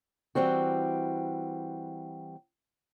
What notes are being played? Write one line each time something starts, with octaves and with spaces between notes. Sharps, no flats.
E3 G3 C4 F#4